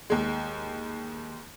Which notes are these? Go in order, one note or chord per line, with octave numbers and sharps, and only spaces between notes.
D#2 G#3